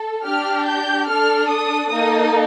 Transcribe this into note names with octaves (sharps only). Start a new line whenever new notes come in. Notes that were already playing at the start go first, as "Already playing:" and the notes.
Already playing: A4
D4 G4 F6
G6
D4 A4 F6
D#6
A#3 D#4 A4 D#6